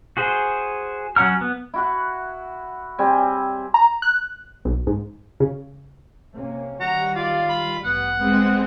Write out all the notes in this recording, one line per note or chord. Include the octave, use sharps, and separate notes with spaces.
F#4 G#4 C5
F#3 C#4 F#5 A#5 F6
B3
E4 F#4 F#5
G3 C4 G#5
A#5
F#6
B1
G#2
C#3
C3 A#3 C#4
D#3 G3 F#4 F#5 A#5
F4 D5 F5
B5
A1 G2 B3 F#5
G#3 B3 C4